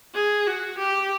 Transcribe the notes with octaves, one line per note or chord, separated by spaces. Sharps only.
G#4
F#4
G4